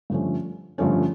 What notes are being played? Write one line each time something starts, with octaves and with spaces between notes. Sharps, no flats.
G2 D3 F3 A3 C#4
G2 D3 F3 A3 C#4